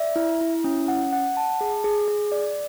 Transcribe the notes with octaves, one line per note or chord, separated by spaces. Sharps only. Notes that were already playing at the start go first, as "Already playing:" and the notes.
Already playing: D5 E5
E4
E4
C#4
F#5
F#5
A5
G#4
G#4
G#4
D5